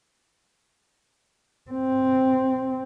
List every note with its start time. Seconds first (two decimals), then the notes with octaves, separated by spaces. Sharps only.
1.70 C4